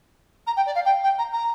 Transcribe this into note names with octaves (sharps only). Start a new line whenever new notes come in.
A#5
G5
D5
F5
G5
G5
A#5
A#5